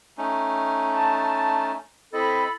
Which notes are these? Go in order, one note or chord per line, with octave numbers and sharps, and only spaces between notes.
A3 C#4 D#4
A5
C4 E4 A4 D#5 B5